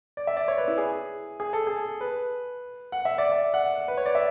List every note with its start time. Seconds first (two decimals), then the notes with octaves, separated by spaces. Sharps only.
0.17 D5
0.27 E5
0.37 D5
0.48 C#5
0.58 B4
0.68 E4
0.78 G#4
1.40 G#4
1.53 A4
1.67 G#4
2.01 B4
2.92 F#5
3.05 E5
3.18 D5
3.32 E5
3.54 F#5
3.88 B4
3.97 C#5
4.06 D5
4.15 E5